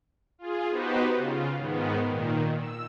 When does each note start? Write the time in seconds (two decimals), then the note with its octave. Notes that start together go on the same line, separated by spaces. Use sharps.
0.39 F4 G#4
0.70 B3 D#4 F#4 G4 B4 C5
1.17 C#3 F4
1.57 G#2 D#3 B3
2.07 A#2 D#3
2.56 E6